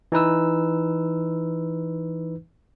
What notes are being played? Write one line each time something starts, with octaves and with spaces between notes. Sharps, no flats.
E3 D#4 B4 E6